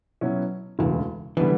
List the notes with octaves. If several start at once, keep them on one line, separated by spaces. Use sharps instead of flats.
B2 F#3 C#4 E4
E1 D2 C#3 E3
D3 E3 G3 B3 D4